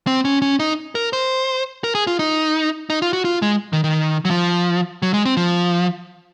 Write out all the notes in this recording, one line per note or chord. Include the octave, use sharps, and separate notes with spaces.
C4
C#4
C#4
D#4
A#4
C5
A#4
G#4
F4
D#4
D#4
F4
F#4
F4
G#3
D#3
D#3
F#3
F3
F#3
G#3
C4
F3